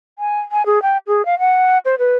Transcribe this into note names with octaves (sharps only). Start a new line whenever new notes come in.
G#5
G#5
G#4
G5
G#4
F5
F#5
C5
B4